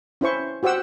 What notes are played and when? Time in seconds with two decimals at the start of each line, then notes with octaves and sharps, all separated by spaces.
0.21 C#4 E4 C5 C#6
0.63 F#4 G4 C5 F#5 E6